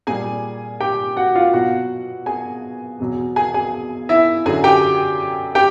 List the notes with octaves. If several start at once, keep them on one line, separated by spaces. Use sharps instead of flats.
A#2 G3 G#4 G#5
G4 G5
F#4 F#5
F4 F5
B2 F#3 F#4 F#5
G#4 G#5
E2 B2 F#3
G#4 G#5
G#4 G#5
E4 E5
F#2 D3 F#3 G#4 G#5
G4 G5
G4 G5